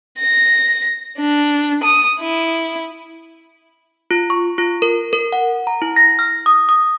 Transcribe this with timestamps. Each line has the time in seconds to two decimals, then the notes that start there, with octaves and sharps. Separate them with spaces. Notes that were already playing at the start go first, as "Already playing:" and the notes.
0.20 A#6
1.19 D4
1.84 D#6
2.21 E4
4.11 F4
4.30 C#6
4.58 F4
4.82 A#4
5.13 A#4
5.32 F#5
5.67 A#5
5.82 E4
5.96 A#6
6.19 F6
6.46 D#6
6.69 D#6